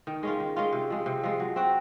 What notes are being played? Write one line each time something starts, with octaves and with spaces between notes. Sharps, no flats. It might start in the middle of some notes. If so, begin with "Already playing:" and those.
D#3
G#3 C#4 F4
D#3
G#3 C#4 F4
C3
F3 G#3
C3
F3 G#3
F#3
C4 F#4